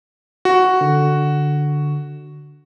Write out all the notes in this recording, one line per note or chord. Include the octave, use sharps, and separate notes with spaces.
F#4
D3